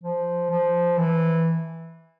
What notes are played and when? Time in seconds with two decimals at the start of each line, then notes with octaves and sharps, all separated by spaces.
0.04 F3
0.50 F3
0.98 E3